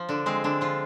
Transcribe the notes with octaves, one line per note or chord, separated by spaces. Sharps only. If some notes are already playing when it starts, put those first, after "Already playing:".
Already playing: F3
D3 D4
G#3 C4
D3 D4
F3 F4